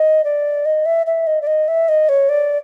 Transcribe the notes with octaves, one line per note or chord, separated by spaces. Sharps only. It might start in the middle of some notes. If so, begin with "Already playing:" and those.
Already playing: D#5
D5
D#5
E5
E5
D#5
D5
D#5
E5
D#5
C#5
D5